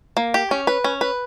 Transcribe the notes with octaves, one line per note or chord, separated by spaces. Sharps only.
A#3
G4
C#4
B4
C#4
B4